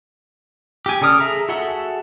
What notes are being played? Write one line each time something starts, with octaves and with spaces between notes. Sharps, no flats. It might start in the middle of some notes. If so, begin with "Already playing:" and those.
G4 G#5
C#3 A4 D5 D#6 F6
G#4 A4 E5 A#5
F#4 G#4 A4 E5 F#5